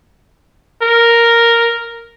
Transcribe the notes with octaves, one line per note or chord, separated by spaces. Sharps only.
A#4